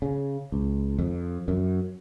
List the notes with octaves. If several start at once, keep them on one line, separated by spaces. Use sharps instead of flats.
C#3
C#2
F2
F#2